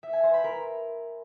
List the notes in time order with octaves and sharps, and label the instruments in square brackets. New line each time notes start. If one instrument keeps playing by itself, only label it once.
[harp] E5
G#5
C5
B5
A#4